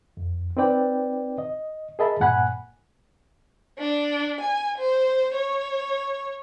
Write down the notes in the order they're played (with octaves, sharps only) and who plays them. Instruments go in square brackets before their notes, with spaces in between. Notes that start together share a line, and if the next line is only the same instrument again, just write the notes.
[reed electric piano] F2
C4 D#4 B4 D5 G5
D#5
G#4 A#4 D#5 E5 A5 B5
G2 A#2 F#5 G#5 B5 F#6
[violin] D4
G#5
C5
C#5